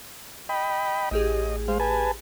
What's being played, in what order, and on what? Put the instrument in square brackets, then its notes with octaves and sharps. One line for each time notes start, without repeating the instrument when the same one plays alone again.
[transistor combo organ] D#5 G5 B5
[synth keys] A1 G4 G#4 [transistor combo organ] D#5
[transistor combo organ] G#3 C5 F5
B4 G#5 A5